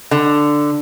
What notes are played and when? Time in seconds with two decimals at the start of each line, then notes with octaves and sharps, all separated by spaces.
0.11 D3